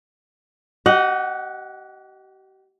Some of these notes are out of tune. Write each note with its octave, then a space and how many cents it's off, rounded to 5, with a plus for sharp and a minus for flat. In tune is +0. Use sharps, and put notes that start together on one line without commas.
G4 -40 D#5 +0 F#5 +0